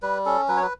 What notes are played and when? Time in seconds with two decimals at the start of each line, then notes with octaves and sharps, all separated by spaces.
0.02 G3 B4
0.26 C#4 A4
0.48 F#3 B4
0.57 C#5
0.63 B4